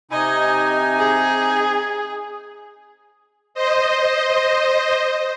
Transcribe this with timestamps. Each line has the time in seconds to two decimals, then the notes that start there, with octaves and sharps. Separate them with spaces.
0.11 C3 D#4 D#5 G#5
0.99 G#4
3.54 C5 D#5